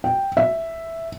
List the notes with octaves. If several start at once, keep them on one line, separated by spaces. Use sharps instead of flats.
G5
E5